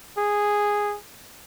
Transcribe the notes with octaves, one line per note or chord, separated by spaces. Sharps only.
G#4